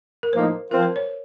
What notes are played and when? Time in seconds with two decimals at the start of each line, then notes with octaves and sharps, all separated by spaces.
0.23 A#4
0.33 A2 F3 A#3 D#4 C5
0.71 F3 C4 F4 A#4
0.83 C5
0.96 C#5